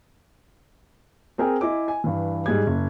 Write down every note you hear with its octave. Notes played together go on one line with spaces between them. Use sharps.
C4 G#4 A#4 G5 G#5
E4 D#5 E5 G#5 D6
G#5
G2 E3
G#2 G3 G#4 G#6
F#1